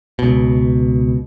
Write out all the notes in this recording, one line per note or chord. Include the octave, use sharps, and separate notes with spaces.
C#2 B2